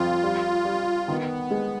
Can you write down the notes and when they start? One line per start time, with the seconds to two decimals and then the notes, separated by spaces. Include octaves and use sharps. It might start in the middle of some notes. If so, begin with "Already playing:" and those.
Already playing: F2 F4
0.24 G3
0.65 G3
1.08 D#3 B3
1.51 G#3